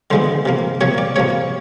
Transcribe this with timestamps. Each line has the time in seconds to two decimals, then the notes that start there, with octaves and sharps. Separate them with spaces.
0.11 D3 F3 G#3 B3 C5
0.46 C3 F3 A#3
0.81 C3 F3 A#3 C#5
0.98 D5
1.16 C3 F3 A#3 C#5